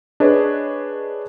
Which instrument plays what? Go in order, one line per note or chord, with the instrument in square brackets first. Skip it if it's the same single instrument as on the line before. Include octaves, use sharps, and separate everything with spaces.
[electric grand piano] D4 G#4 B4 C#5 D#5